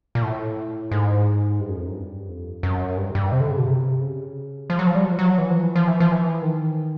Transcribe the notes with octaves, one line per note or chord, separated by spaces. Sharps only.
A#2
A2
G#2
G2
F#2
F2
F#2
G2
F2
F#2
G2
G2
C3
D3
C#3
B2
C3
C#3
F3
F#3
F3
G3
F#3
F3
F#3
E3
F3
E3
F3
E3
F3
E3
D#3